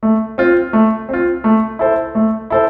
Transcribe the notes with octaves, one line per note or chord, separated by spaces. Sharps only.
A3
C4 F4
A3
C4 F4
A3
E4 A4 C5
A3
E4 A4 C5